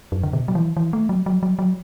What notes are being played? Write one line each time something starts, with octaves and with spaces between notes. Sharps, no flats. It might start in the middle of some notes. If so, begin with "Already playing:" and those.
F#2
D3
B2
F#3
E3
E3
A3
F#3
F#3
F#3
F#3